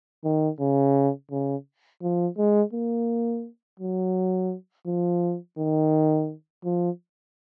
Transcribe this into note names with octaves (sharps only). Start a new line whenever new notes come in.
D#3
C#3
C#3
F3
G#3
A#3
F#3
F3
D#3
F3